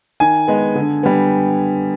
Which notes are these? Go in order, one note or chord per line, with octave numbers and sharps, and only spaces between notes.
D#3 G#5
G#3 B3
D3
G3 B3